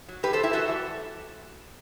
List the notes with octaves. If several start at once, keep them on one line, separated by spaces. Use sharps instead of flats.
F#3
A2 G4 B4
A4 C5
F#3
E4 G4
F#2 F#4 A4
E3 G3